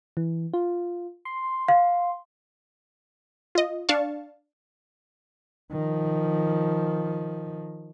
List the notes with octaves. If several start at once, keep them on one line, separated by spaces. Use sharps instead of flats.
E3
F4
C6
F5
F4 D#5
D4 F5 A5 C#6
D#3 F3